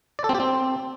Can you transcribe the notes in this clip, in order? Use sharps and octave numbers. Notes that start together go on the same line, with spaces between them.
D5
A4
C4
G4
C4